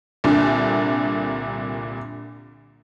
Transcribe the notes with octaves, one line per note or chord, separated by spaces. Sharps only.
C2 A#2 D3